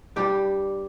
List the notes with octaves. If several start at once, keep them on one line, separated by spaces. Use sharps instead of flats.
G2 G3 G4